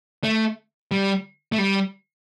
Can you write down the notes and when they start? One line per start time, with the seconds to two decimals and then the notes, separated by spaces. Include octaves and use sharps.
0.23 A3
0.91 G3
1.52 A3
1.58 G3